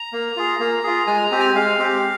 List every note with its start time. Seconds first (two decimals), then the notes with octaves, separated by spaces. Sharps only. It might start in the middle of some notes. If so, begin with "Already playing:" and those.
Already playing: A#5
0.13 A#3
0.36 F4 G#4
0.60 A#3
0.84 F4 G#4
1.07 G#3 G#5
1.23 A#5
1.31 C4 G4
1.40 G#5
1.54 G#3 F5
1.79 C4 G4